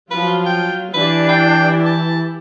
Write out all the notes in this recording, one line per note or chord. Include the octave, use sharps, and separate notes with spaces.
F3 F#3 F4 B4
G5
E3 D4 E4 G4 B4
G5
A5